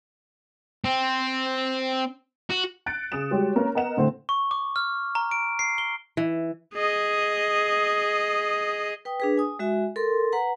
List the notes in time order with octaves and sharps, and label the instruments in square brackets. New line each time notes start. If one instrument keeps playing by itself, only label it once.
[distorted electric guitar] C4
F#4
[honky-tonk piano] F#6 A6 C#7 D7
C#3 G#4 D#6 E7
G3 G#3 F#4 G4 C#5
A#3 C#4 A#4 B4
B3 A#4 D#5 F#5 E7
A2 D3 A3 C4
[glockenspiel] C#6
D6
F6
A#5
D7
C7
G7
[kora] E3
[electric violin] G#4 D#5
[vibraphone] B4 G5 D#6
D4 G#4 B4
G#5 D#6
G#3 F#4 E5 G#5
A4 A#4 C6
B4 F#5 A#5